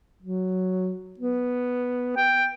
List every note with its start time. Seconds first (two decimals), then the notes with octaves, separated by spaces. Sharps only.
0.22 F#3
1.19 B3
2.16 G5